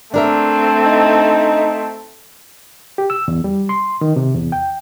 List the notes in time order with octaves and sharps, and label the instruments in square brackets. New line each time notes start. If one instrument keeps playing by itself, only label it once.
[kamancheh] A3 C4 [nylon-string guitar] D4 A#4 E5
[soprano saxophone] D#4
[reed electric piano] G4
E6
E2
G3
C6
D#3
C3
E2
G5